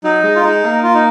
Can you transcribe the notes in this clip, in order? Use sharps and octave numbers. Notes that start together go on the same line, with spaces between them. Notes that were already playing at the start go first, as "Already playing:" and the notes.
F#3 D#4
G#3
F4
G#3 D#4
A#3
F4
D#4